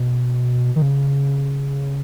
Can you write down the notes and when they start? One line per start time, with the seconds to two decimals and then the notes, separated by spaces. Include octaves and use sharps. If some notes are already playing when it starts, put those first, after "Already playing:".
Already playing: B2
0.76 D#3
0.82 C#3